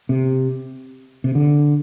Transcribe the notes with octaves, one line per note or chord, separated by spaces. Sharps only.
C3
C3
D3